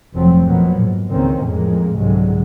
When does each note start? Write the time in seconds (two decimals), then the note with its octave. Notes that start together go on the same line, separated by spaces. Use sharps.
0.15 F1 F#2 F3 F#3 A3 C4
0.47 B2 F3 F#3 A#3 B3
0.81 G#2
1.11 C#2 D#3 E3 A#3 C4 C#4
1.43 F2 A2 G#3 A#3
1.97 C2 G#2 D3 F#3 G#3